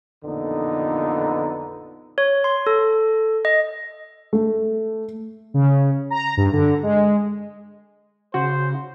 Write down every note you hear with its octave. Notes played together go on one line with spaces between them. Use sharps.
A1 F2 A#2 D3 B3 D#4
C#5
C6
A4
D#5
A3
C#3
A#5
G2
D3
G#3
C#3 F#4 C5